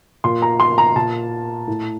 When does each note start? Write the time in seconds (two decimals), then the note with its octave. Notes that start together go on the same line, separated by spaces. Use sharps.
0.24 A#2 C6
0.42 A#5
0.60 C6
0.78 A#5
0.96 A#2 A5
1.67 A2